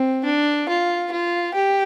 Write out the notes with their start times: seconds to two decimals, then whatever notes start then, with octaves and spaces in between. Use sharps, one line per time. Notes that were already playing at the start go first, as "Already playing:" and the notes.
Already playing: C4
0.25 D4
0.69 F4
1.12 F4
1.54 G4